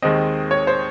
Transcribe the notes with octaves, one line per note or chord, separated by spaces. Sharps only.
D#2 D#3 G#3 C4 D#5
C#5
C5